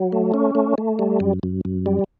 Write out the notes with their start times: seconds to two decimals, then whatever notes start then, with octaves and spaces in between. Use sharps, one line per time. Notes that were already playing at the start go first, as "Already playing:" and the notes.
Already playing: F#3
0.12 A3
0.34 C#4
0.55 A3
0.78 A3
0.99 G3
1.20 F#2
1.43 F#2
1.65 F#2
1.86 G3